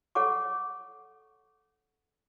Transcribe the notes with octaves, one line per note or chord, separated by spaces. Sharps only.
A4 C#5 F#5 C#6 D6